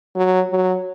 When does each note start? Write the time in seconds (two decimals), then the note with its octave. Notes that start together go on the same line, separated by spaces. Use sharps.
0.16 F#3
0.51 F#3